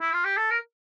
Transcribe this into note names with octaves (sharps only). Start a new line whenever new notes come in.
E4
F4
G4
A4
A#4